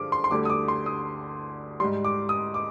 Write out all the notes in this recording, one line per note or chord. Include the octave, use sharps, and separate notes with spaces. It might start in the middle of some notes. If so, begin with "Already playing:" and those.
Already playing: G2 D3 F3 G#3 D6
C6
C6
D2 D3 G3 D6
D#6
D6
C6
D#6
G#2 G3 C6
D6
D#6
D6